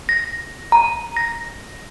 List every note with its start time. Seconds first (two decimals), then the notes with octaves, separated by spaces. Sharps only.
0.09 A#6
0.72 A#5
1.17 A#6